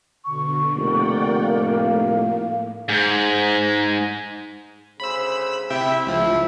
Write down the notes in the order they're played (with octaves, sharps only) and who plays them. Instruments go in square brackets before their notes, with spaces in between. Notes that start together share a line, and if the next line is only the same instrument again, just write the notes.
[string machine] B2 D3 [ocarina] C#6
[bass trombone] F1 [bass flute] A#3 [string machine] D5 F#5 G5
[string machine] A2 [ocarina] F5
[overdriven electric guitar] G#2
[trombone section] D2 C#3 C5 [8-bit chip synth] B5 E6
[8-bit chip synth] C3 E5 G5 [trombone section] E4
[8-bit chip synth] C#2 F3